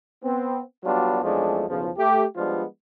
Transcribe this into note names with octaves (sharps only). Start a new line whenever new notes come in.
B3 C4
F#3 G3 B3 D4 F4 F#4
E2 F3 G#3 A3 C#4 D4
B1 E2 C#3 F3
A3 G4
F3 G3 G#3 B3 D4 F4